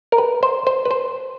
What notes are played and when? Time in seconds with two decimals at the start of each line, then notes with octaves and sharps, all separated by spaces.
0.12 A#4
0.18 B4
0.43 C5
0.67 C5
0.85 B4
0.91 C5